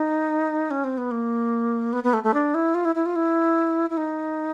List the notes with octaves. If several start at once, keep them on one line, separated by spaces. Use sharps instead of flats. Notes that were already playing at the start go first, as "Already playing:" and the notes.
Already playing: D#4
C#4
C4
B3
A#3
B3
B3
A3
A3
D4
E4
F4
E4
E4
F4
E4
E4
D#4